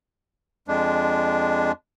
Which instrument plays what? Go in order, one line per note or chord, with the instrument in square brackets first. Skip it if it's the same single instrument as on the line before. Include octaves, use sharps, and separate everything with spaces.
[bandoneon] F2 G#3 D4